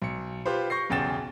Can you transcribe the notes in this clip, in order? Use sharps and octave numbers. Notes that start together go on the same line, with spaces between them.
B1 C#7
F4 G4 B4 C5
C#6 G6 A#6 C7
B1 E2 C#3 G5 A6 E7